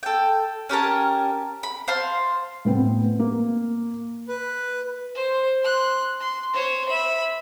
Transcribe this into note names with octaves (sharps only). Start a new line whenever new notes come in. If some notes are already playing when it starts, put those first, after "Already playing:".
A4 G5
C#4 G4 A#4 A5
B5
C5 F5 A5 C6
A2 B3 C4
A#3
B4
C5
C6 F#6
C6
C5 C#5
E5 B5